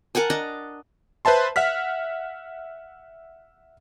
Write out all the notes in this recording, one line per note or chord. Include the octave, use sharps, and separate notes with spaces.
A#4 F#5 G#5 A5
D4 D#5 A5 A#5
B4 C5 E5 A5 C6
E5 F#5 F6 B6